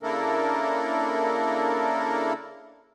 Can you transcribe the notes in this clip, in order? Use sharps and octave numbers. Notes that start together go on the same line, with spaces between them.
C#3 A#3 D4 E4 A4 A#4